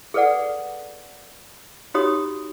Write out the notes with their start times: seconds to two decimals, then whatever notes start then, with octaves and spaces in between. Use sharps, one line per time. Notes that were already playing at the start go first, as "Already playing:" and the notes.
0.14 G#4 A4 B4 D5 F#5
1.94 D#4 F#4 G4 C#5 B5 D#6